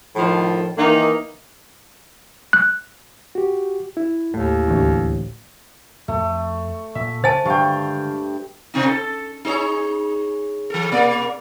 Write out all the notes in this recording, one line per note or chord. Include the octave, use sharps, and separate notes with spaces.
A2 D#3 F3
D#3 E3 A#3 D#4
F#6
F#4 G4
E4
D#2 A2
A1 D2
F2 A3 C4
A#2 E5
C#3 C5 G#5 A5 A6
G2 D3 D#3 G#3 F5 G5 C#6
C3 C4 D#4
A4
D#4 G#4 C#5
E3 A4
B2 A#3 D5